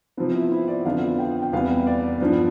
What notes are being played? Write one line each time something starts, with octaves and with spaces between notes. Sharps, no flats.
C3 F3 B3 C4
E4
E4
D5
F2 D3 F3 B3 F5
G5
G5
E2 C3 G3 B3 F5
D5
G2 F3 B3